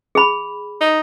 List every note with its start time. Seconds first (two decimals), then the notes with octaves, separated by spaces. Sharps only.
0.15 G#4 B5
0.81 D#4